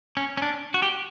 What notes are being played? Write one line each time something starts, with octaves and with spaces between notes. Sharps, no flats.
C#4
C#4
D4
F#4
G4